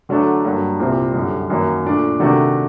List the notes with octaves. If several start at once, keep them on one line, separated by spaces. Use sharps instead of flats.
D3 F#3 A3 D4 A4
G2 F#3 A#3
C2 A#2 G3 C4
F#2 D3 G3
F#2 D#3 F#3 A#3
A#2 A3 D4
C3 D#3 A3 D4 F#4